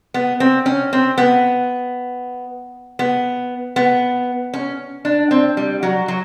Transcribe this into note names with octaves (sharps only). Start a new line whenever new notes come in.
B3
C4
C#4
C4
B3
B3
B3
C#4
D4
C4
G3
F#3
F#3